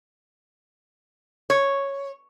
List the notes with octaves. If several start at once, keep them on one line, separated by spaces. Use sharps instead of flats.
C#5